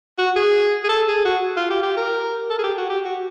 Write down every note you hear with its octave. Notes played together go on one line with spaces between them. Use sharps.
F#4
G#4
G#4
A4
G#4
F#4
F4
G4
G4
A#4
A4
G#4
G4
F#4
G4
F#4